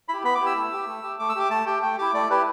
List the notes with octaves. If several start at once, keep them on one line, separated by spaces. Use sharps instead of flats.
E4 G4 B5
B3 B5
D6
E4 G4
E6
A3
G4
A3
G4
A3 D6
E6
G4 D6
A3 A5
G4 G5
A3 G5
E4 G4 D6
A3 D5
E4 G4 B4